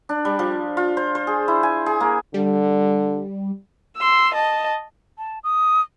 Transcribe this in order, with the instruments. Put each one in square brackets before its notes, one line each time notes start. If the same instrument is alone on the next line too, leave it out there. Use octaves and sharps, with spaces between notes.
[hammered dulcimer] D4
G3
F3
F4
C5
C5
G#4
E4
G#5
G#4
A#3
[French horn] D3 [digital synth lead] G3
[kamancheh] C6 E6
D#5 A5
[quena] A5
D#6